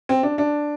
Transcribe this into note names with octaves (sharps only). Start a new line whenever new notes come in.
C4
D4
D4